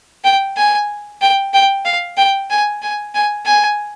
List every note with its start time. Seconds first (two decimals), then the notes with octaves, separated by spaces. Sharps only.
0.24 G5
0.57 G#5
1.22 G5
1.53 G5
1.85 F5
2.18 G5
2.50 G#5
2.82 G#5
3.15 G#5
3.46 G#5